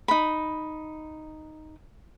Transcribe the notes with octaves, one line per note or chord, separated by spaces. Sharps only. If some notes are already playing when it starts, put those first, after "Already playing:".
D#4 B5